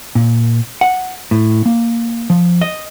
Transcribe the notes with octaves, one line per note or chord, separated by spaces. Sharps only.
A#2
F#5
A2
A#3
F3
D#5